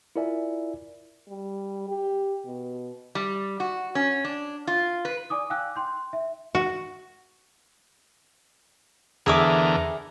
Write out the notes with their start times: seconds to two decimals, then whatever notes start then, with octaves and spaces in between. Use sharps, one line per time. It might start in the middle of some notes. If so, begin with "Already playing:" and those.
0.16 E4 F4 A#4 D5 E5 G#5
1.28 G3
1.89 G4
2.45 B2
3.15 G3
3.60 F#4
3.95 C#4
4.25 D4
4.67 F4
5.05 B4
5.30 D5 G#5 D6 D#6
5.50 F5 G5 G#5 D6 E6 F#6
5.76 G5 C6 G6
6.13 E5
6.55 F#4
9.26 E2 D3 G#4 A#4 E5 D6